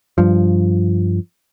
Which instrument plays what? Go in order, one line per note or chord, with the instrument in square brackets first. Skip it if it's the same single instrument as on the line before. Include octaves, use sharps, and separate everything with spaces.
[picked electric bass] G2 F3